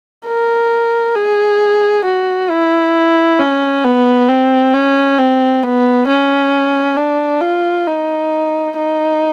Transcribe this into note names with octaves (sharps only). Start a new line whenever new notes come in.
A#4
G#4
F#4
E4
C#4
B3
C4
C#4
C4
B3
C#4
D4
F4
D#4
D#4